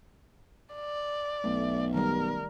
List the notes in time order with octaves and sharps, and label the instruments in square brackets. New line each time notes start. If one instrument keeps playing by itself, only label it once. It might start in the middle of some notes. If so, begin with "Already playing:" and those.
[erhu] D5
[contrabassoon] B1 [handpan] A3
[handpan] D#3 G3 [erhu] A#4